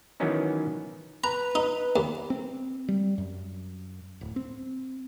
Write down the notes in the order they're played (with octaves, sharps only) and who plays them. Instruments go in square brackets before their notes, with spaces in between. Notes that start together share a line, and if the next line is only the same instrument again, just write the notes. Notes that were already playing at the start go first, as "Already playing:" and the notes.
[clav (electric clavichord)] D#3 E3 F#3 B3 C#4 D#4
[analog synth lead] B4 [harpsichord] A#5
[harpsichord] D#4
D#2
[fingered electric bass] C4
G3
F#2
D1
C4